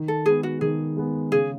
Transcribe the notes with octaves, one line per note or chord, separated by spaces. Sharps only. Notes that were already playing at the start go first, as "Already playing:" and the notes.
Already playing: D#3
A4
G#3 B3 G#4
F#4
D#3 G#4
G#3 B3
C#3 G#4